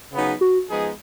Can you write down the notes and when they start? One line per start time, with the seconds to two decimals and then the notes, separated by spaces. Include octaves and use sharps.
0.12 C#3 F#3 B3 D#4 G#4
0.41 F#4
0.69 F3 G#3 B3 D#4 G#4